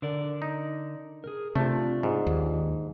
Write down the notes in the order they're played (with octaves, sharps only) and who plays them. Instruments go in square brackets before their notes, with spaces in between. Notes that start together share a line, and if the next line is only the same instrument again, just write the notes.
[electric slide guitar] D3 A#4 D5
[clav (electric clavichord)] D#4
[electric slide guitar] G#4 A#4
[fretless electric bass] C3 [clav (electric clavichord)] A3 [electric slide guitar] D4 F4
[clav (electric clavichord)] G#2
[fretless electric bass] D#2